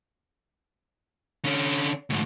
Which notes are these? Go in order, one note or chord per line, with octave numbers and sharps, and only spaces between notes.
D3 C#4
D2 G#2